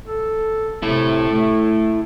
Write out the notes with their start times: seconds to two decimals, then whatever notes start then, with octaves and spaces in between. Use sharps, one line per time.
0.07 A4
0.83 C3 E4 A4
1.29 A3